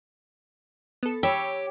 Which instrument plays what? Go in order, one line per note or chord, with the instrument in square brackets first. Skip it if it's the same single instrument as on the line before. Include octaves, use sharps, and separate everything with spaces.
[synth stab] B3 A4
[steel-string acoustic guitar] G4 [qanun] C#5 [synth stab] B5 E6